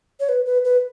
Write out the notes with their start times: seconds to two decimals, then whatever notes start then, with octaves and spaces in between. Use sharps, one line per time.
0.20 C#5
0.29 B4
0.46 B4
0.65 B4